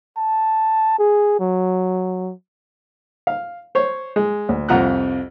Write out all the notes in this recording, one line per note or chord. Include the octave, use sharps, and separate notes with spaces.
A5
G#4
F#3
F5
C5 C#5
G#3
D2
C2 F2 F4 F#5 A#5 F#6